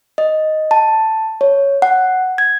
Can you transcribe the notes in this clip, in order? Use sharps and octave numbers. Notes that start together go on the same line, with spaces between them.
D#5
A5
C#5
F#5
G#6